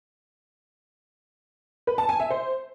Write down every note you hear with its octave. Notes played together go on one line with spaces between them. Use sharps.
B4
A5
G#5
E5
C5